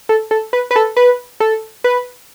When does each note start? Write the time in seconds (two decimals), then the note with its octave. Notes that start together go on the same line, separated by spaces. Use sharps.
0.09 A4
0.31 A4
0.53 B4
0.71 B4
0.76 A4
0.97 B4
1.40 A4
1.84 B4